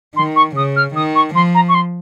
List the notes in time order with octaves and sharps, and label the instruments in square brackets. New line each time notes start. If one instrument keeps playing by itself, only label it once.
[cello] D#3 [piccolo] C6
[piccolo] C#6
[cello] C#3 [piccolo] D#6
[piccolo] F6
[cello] D#3 [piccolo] D#6
[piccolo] C#6
[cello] F3 [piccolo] C6
[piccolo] A#5
C#6
C6